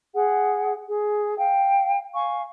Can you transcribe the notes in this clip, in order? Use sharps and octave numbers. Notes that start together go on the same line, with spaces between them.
G#4 F#5
G#4
F5 G5
F5 G#5 C#6